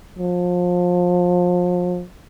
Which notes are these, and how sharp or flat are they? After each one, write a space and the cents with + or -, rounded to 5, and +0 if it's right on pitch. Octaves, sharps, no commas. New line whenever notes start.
F3 +30